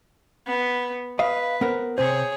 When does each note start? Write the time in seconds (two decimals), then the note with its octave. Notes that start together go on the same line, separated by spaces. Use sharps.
0.47 B3
1.19 B4 D#5 F5
1.61 B3 A#4 C5
1.98 C3 C4 G#4 C5 C#5